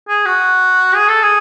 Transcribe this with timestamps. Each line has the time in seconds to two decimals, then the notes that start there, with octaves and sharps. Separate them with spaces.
0.08 G#4
0.26 F#4
0.94 G#4
1.08 A4
1.22 G#4